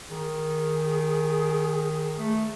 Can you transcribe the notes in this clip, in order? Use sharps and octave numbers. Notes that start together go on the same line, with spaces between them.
D#3 G#4
A3